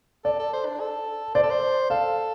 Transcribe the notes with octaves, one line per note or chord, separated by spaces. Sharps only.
A4 D5
A4
C5
D4
A4
C5 D5
A4
C5
A4 F5